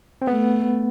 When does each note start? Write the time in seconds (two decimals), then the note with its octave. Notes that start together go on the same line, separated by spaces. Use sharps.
0.22 C4
0.27 A3 B3